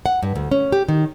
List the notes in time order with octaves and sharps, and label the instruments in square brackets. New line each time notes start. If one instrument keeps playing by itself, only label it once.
[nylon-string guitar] F#5
G2
D2
C#4
G4
D#3